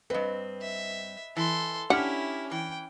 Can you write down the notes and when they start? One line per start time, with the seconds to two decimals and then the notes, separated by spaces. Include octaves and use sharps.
0.10 G2 C4 B4 D#5
0.61 E5
1.37 E3 A4 C6
1.90 C#4 D4 E4 G4 F#5 F6
2.51 E3 G5